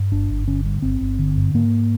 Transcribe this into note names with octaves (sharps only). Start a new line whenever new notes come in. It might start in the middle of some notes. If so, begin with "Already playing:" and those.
Already playing: G2
G1 D4
G1
D3 C#4
G2
G1 C4
G1
D3
G2
G#2 A#3